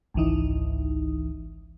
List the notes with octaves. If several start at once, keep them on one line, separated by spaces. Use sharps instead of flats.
G#1 C#2 E3 D#4